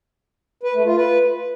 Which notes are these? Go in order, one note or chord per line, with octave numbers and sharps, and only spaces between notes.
B4
A3
F4
B4